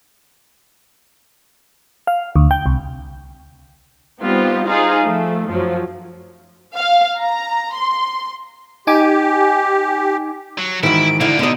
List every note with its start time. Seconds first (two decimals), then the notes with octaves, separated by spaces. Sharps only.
2.07 F5
2.36 D2
2.51 G5
2.66 C2
4.22 G3 B3 C4 D#4 F4 G4
4.67 D#4 F4 G#4 C5 F5
5.03 F3 A3
5.49 F#2 F3 F#3
6.74 F5
7.18 A#5
7.73 C6
8.87 D#4 G4 G#5 D6
10.58 F#3
10.83 G#2 D#3 E3 E4 F#4 D7
11.21 D3 F3 A#3 E4 D7
11.39 B2 D3 D#4 D#5